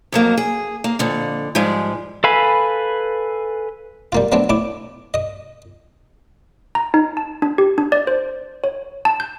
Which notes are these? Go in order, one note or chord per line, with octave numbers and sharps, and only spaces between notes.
F2 F#3 A#3
G#4
A#3
F2 A#2 D3
G#2 F3 G3 G#3
A4 B4 F5 G#5 B5
G3 A#3 F4
F#3 A3 B3 C4 D4
A2 E4 D6
D#5 D#6
A#5
D#4
A5
D4
G4
D4
D5
C5
C#5
A5
G6